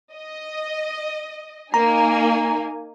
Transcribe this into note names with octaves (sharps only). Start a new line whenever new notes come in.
D#5
A#3 D#4 G#5 A#5